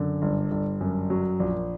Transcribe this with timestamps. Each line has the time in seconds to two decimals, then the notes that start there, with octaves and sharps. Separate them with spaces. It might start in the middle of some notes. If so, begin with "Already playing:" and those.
Already playing: F#2 D3
0.22 G1
0.51 G1
0.81 F#2
1.10 F#3
1.40 A#1